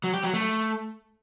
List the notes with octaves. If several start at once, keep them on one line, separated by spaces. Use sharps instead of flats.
F#3
G4
F#3
A3